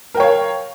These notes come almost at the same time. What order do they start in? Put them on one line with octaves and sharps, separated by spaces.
A#4 G5 C#5 F5